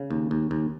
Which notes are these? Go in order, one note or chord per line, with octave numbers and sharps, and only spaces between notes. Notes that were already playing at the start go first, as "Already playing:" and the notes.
Already playing: C#3
D#2
D#2
D#2